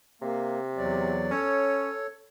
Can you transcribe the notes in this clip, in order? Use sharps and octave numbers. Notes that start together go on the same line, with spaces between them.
C3 A#3
E2 F#3 D5
C#4 A4 C#5